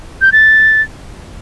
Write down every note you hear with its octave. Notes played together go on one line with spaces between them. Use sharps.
G6
A6